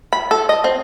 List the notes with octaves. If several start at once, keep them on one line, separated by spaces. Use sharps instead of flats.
B5
A4
D#5
C4